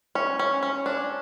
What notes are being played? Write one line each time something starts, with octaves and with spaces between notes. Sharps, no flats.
C#4
C#4
C#4
D4